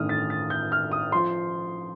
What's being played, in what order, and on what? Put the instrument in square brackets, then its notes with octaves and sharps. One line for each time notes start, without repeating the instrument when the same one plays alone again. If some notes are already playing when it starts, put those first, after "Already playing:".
Already playing: [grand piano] A1 G2 D#3 A3 D#6 F6
A6
A6
G6
F6
D#6
F3 C6